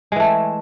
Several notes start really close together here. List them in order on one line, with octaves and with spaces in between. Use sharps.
G#3 E3 A3